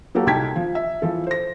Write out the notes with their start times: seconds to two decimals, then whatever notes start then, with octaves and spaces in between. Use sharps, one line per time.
0.15 F#3 A#3 F#4 G4 A4
0.27 C2 D#4 G5 A5 G#6 B6
0.56 F3
0.75 E5
1.02 E3 F3 A4
1.27 C5 A#6